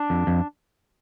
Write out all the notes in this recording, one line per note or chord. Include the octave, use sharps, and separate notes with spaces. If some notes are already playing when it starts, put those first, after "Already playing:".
Already playing: D4
F2
F2